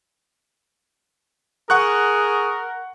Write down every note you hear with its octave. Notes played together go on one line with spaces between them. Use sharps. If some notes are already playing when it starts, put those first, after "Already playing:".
G#4 A#4 F#5 C#6 F#6